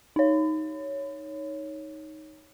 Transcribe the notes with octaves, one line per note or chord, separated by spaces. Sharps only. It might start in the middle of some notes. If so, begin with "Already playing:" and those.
D#4 C#5